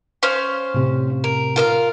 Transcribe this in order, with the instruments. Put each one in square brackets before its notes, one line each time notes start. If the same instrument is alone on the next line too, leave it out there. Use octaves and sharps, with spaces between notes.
[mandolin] C#4 C5 F5
[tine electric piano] A2 C3
[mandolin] A#4
F4 A#4 F5